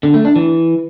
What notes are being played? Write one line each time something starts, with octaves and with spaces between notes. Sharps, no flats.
D3
A3
D4
E3